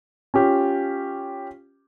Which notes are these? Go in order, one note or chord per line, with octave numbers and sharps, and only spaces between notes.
C#4 F4 G4